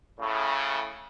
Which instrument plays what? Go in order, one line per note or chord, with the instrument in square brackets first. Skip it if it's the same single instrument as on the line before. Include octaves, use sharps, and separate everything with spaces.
[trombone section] A2 C#3